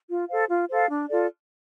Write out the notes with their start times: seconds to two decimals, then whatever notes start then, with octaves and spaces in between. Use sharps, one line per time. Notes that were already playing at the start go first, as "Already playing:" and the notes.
0.09 F4
0.28 A4 C5 F5
0.49 F4
0.70 A4 C5 F5
0.90 D4
1.09 F4 A4 D5